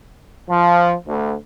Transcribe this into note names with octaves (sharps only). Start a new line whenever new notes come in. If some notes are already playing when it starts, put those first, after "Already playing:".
F3
D2